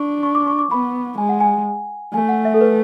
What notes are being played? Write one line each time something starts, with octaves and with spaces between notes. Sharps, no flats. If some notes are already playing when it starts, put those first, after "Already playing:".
Already playing: D4 C#6
C#6
D6
C#6
D6
B3 B5
G#3 G#5
F#5
G#5
A3 G#5
F#5
E5
A4
B4